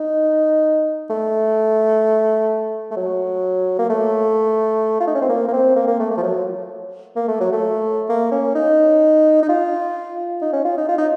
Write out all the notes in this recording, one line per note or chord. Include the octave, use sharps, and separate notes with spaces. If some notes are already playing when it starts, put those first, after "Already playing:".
Already playing: D#4
A3
A3
F#3
A#3
A3
F4
D#4
C#4
C4
A#3
A#3
C4
A#3
A#3
A3
A3
F3
F#3
A#3
A3
F#3
A3
A#3
C#4
D#4
D#4
F4
D#4
C#4
F4
D#4
F4
D#4